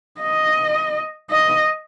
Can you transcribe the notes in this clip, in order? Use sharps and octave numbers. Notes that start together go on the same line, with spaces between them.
D#5
D#5